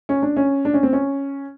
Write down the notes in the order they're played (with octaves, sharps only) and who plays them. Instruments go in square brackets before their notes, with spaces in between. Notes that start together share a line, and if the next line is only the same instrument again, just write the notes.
[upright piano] C#4
D4
C#4
D4
C#4
C4
C#4